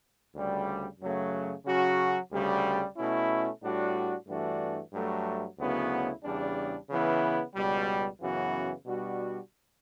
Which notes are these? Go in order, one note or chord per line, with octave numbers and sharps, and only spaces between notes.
D2 C#3 G3
F#2 C#3 F#3 A3
C#3 F#3 C#4 F#4
D2 C#3 G3
B2 A3 C#4 E4
A2 G3 D4 F#4
G2 E3 A3 D4 F#4
G2 F#3 A3
D2 C#3 F#3 B3 E4
E2 C#3 G3 D4
C#3 E3 B3 E4
C#2 B2 G3
F#2 C#3 E3 B3 F#4
B2 G3 D4 F#4